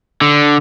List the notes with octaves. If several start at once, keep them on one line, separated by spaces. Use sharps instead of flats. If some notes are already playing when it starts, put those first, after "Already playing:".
D3